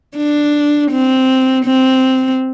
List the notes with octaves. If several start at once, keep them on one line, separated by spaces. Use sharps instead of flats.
D4
C4
C4